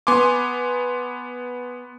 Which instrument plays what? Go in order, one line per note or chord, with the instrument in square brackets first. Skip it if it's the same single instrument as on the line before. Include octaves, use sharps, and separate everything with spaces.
[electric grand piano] B3 G#5 C6 D6